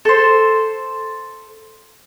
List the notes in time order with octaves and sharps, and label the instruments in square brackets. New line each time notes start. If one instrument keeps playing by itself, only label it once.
[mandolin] A4 C5